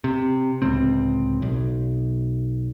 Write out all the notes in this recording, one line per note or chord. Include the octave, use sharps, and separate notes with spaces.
C3
D1 C#2 C4
B1